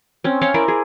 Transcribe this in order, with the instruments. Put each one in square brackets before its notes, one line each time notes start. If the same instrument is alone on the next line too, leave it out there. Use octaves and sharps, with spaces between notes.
[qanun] C4 C#4
C#4 C5 C#5 F5
E4 A#4 C5 D5
G#4